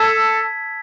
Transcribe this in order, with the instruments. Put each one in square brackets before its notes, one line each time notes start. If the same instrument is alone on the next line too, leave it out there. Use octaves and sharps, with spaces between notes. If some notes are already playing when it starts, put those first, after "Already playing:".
Already playing: [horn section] A4 [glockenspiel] A5 E6 G#6 B6